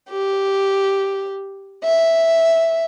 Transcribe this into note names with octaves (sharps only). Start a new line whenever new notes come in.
G4
E5